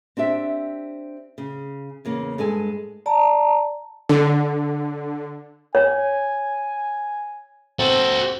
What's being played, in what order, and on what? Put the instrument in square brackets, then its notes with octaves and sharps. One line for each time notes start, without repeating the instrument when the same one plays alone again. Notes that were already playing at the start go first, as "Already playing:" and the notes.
[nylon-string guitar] C4 D4 G4 E5
C#3
E2 C#3 A#3
G2 G#3 A4 G#5
[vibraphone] D5 A5 A#5
[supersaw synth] D3
[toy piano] C#5 [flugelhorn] G#5
[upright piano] C4 [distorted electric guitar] F#4 A4